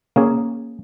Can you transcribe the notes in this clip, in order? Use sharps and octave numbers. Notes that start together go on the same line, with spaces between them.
A#3 C#4 G#4